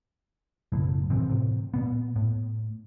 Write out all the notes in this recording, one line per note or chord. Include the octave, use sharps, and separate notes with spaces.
F#1 B1 A2
A2 C3 E3 C4
A2 C3
A#2 B3
A2